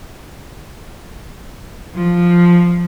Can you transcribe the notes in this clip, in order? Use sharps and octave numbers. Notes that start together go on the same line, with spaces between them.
F3